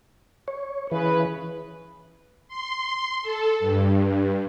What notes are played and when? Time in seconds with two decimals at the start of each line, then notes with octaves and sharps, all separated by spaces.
0.48 C#5
0.92 C#3 E3 B4
2.48 C6
3.22 A4
3.60 G2